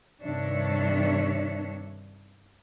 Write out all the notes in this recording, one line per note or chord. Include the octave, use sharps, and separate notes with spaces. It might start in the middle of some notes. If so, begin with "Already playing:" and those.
G2 C3 D#3 D4 C#5 E5